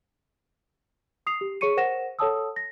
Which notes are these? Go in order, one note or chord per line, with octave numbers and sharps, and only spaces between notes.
D#6 C7 F7
G4
G#4 C#5 C#6 C#7 D#7
A#4 C5 F#5 A#6 E7
A4 C#5 F#5 A5 D#6 E6
A#6